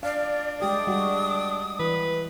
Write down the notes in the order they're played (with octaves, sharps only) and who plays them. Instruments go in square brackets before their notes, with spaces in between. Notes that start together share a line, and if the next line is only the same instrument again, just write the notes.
[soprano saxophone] D4 [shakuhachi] D5 [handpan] F5
[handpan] G#3 G4 D5 [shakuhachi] D#6
[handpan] G3 F#4
[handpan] E3 [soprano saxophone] B4